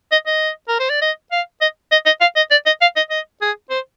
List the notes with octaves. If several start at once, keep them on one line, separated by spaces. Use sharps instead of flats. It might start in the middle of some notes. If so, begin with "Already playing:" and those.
D#5
D#5
A#4
C5
D5
D#5
F5
D#5
D#5
D#5
F5
D#5
D5
D#5
F5
D#5
D#5
G#4
C5